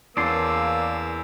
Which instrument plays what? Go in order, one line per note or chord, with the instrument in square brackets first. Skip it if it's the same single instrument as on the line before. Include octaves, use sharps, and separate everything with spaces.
[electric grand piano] E2 C#4 [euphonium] A#3 [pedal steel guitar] D5 A5 C6 [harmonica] E6